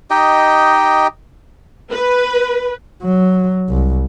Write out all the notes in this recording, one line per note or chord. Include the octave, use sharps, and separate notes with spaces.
D#4 G4 D#5 G5
B4
F#3
C2